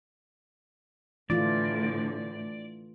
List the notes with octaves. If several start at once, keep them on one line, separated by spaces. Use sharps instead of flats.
A2 D3 E3 A3 F4 D5